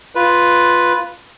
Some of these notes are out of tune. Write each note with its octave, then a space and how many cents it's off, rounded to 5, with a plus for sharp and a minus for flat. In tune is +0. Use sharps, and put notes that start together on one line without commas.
F4 +0 B4 +0